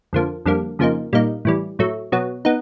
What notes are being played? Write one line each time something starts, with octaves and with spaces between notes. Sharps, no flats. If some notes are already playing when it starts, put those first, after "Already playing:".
F2 D3 F3 A#3
F2 D3 G3 A#3
F2 C#3 F3 A#3 D#4
A#2 G3 A#3 D#4
A2 E3 G3
A2 F#3 A3
B2 F#3 B3
B3 D#4